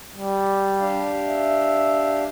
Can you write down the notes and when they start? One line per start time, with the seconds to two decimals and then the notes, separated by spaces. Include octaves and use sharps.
0.13 G3
0.80 D4 G4 F5
1.28 E5